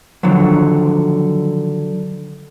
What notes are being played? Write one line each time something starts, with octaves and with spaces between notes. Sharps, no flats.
D3 D#3 F3 F#3